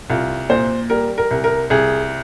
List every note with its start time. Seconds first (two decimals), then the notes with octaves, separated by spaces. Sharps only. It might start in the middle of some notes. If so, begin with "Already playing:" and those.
0.10 C2 F4
0.49 A#2 C5
0.90 G3 A#4
1.18 A#4
1.31 C2
1.44 A#4
1.70 C2 G#4